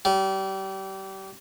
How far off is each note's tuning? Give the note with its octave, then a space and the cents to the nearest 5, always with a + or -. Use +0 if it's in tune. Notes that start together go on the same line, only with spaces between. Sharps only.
G3 -30